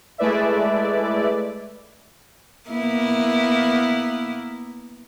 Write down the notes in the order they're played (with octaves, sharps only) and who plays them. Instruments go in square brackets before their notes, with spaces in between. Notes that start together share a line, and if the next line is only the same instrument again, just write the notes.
[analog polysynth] G#3 A3 E4 B4 D5 E5
[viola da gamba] A#3 B3 E4